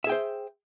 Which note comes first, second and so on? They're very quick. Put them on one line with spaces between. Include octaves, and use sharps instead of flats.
E5 G#4 G5 C5